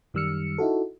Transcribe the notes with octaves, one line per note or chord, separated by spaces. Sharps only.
F#2 D#3 G3 E6 F6 C#7
D#4 E4 F#4 A4